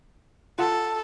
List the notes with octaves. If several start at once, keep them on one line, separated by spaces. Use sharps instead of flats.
F4 A4 F#5 A5